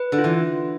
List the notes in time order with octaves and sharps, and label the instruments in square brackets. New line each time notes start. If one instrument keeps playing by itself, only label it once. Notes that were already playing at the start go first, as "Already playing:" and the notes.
Already playing: [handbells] B4
[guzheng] D3
[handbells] F4
[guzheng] E3